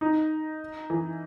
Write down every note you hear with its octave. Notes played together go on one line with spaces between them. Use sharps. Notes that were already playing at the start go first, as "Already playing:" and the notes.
D#4
E3